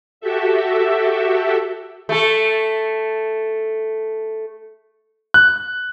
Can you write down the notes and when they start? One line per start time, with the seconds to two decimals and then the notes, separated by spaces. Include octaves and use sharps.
0.21 F#4 G4 A4 E5
2.09 A3 A4
5.34 F#6